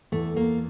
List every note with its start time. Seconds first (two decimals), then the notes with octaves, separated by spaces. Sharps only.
0.12 E2 A3
0.36 A#3